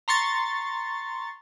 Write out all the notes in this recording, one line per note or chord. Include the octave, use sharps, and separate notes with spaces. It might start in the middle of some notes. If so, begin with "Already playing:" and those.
A#5 C6 C#6 A6